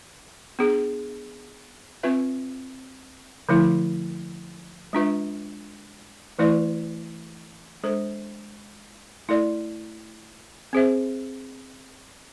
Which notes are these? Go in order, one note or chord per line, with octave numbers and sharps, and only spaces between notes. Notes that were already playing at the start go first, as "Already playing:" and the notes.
B3 D4 G#4
C4 F4 B4 E5
D3 F3 A3 E4
G#3 D4 F4 B4 E5
E3 A3 E4 B4 D5
G#3 D4 A4 C5
A3 E4 A4 D5
C4 G#4 C5 E5